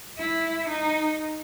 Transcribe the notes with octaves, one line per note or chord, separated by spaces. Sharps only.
E4
D#4